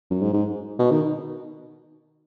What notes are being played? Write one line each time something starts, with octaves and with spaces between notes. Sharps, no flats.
F#2
G#2
G#2
B2
D#3